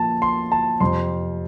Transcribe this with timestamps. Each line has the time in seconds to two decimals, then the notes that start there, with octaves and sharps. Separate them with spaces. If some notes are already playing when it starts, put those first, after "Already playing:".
Already playing: A#2 F3 A5
0.22 C6
0.52 A5
0.80 F2 C3 F3 C6